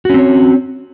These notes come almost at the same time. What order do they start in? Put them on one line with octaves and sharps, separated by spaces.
F#4 C#4 C4 C#5